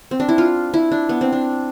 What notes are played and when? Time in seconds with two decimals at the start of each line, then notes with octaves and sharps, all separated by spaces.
0.11 C4
0.20 D4
0.29 E4
0.38 F4
0.74 E4
0.92 D4
1.09 B3
1.21 C4
1.32 D4